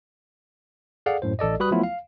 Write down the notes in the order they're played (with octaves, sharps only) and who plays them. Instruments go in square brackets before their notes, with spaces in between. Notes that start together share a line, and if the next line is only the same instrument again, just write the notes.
[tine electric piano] G#4 A4 D5 F5 F#5
F#2 A2 C5
A1 A4 D5 D#5
G3 F#4 B4 B5 D#6 F#6
F3 F#3 A3 B3 E4 F4
F5